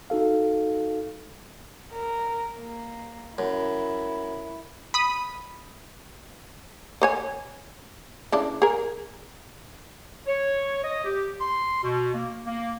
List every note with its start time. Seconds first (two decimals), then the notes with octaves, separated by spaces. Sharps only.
0.10 D#4 F#4 A4 F5
1.92 A#4
2.59 A#3
3.38 F#2 E4
4.94 B5 D#6
7.02 B4 C#5 G#5
8.32 C#3 E3 D4
8.62 G#4 A#4
10.27 C#5
10.84 D#5
11.05 G4
11.41 C6
11.84 B2
12.15 A#3
12.47 A#3